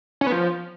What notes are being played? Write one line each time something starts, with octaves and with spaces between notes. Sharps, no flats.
C#4
B3
F3